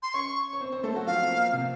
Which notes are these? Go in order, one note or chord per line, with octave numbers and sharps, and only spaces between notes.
C6
C#4 C#5 C#6
C#5
C4 C5
C4 C5
A3 A4
F#3 F#4
F3 F4 F5
C4
A#3
C3 C4